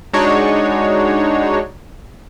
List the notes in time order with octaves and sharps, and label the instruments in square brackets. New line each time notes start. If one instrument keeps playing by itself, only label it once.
[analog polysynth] G#3 D4 D#4 F#4 C#5